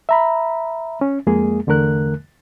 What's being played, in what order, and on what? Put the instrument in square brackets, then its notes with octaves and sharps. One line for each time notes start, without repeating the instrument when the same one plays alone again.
[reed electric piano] E5 A#5 B5
C#4
F2 G#3 A#3 G#4
E2 D3 A3 A#4 F#6